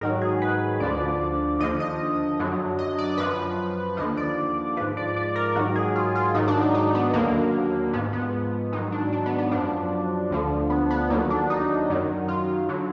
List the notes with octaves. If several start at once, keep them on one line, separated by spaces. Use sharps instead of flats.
G#2 D#3 F#3 A#4
G#4
B4
D2 D3 F3 D5
D#2 D3 F3 D#5
D#5
F#2 D3 F#3
D#5
D5
F#2 F3 B4
D#2 D3 F3 D#5
D5
G#2 F3 B4
D5
D5
A#4
G#2 D#3 F#3 F#4
G#4
F4
F4
G#2 D#3 F#3 D#4
D4
D#4
D#4
B3
D#2 D3 F#3 A#3
G#2 F3 B3
B3
G#2 D#3 F#3 D#4
D4
D4
B3
B3
F#2 F3 D4
D2 D3 F3
B3
B3
D#2 D3 F#3 A#3
D4
D#4
F#2 D#3 F#3
F4
D3 F#3